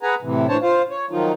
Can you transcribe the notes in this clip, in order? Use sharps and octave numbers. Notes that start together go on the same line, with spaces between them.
G#4 B4 F#5 G#5 A#5
A2 C3 E3
A2 E3 D4 C5 C#5 A5
F4 C5 F5
C#5
D#3 F3 F#3 D#4 F4